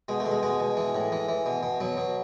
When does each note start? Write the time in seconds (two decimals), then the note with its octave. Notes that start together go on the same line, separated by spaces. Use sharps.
0.08 B2 G#3
0.20 A3
0.26 B2
0.32 G#3
0.43 B2 G#3
0.60 B2
0.77 E3
0.95 A2
1.12 E3
1.29 E3
1.46 B2
1.63 B2
1.80 B2 F#3
1.97 B2